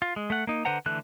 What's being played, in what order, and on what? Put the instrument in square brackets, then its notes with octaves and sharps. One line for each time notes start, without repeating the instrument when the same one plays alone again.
[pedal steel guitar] F4
G#3
A3 F#5
A#3 D#4
D3 B4 C5 F#5 A#5
D3 E3 A3 F#6